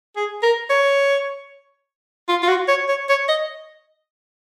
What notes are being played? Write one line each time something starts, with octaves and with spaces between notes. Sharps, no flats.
G#4
A#4
C#5
F4
F4
F#4
C#5
C#5
C#5
D#5